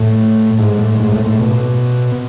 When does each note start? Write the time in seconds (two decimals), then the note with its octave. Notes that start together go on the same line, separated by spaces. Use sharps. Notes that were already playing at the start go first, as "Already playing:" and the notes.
Already playing: A2
0.59 G#2
0.79 A2
0.99 G#2
1.12 A2
1.26 A2
1.39 B2